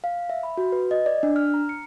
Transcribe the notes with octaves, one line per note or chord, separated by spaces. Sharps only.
F5
E5
B5
F#4
B4
D#5
D5
D4
F6
A#5
C#7